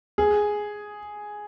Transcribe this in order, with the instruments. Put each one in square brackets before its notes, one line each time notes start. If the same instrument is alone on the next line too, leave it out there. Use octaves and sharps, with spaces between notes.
[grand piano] G#4